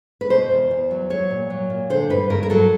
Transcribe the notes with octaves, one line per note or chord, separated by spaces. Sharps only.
B4
B2 C5
E2
E2
F#3
F#3 C#5
A#2
F#3
A#2
D3 C5
G2 B4
G2 A#4
A#4
F#3 A4